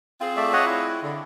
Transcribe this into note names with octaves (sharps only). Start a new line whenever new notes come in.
C4 F4 G#4
A3 D5 E5
C#5 D#5 F#5
E4
D3